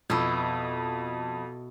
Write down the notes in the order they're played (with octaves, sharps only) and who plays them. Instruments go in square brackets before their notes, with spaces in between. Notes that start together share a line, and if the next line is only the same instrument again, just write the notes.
[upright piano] F2 [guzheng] B2 E4